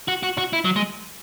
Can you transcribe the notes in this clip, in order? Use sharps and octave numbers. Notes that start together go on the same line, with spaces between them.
F#4
F#4
F#4
E4
F#3
G#3